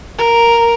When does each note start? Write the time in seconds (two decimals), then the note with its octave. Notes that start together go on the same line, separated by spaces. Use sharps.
0.18 A#4